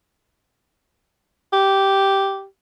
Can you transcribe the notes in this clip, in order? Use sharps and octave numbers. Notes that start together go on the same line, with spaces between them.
G4